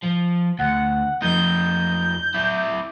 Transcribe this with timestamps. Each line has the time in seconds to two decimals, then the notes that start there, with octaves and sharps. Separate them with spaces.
0.03 F3
0.59 D2 F#5
1.22 F2 D#4 G6
2.34 E4 D5